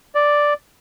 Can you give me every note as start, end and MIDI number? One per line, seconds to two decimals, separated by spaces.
0.15 0.54 74